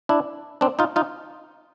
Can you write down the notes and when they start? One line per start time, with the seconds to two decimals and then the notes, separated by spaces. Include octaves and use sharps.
0.09 D4 E4
0.61 C4 D4
0.79 D#4 F4
0.96 D#4 F4